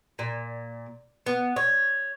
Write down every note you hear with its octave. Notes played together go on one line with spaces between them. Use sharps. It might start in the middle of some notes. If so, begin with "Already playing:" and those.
A#2
B3
C#5